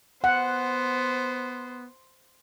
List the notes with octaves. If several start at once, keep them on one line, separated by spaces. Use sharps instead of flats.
B3 C5 F#5